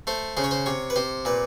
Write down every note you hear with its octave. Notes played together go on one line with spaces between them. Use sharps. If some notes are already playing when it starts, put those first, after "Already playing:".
A3 C5
C#3 C5
C#5
C5
C3 C#5
B4
C3 C5
A#2 B4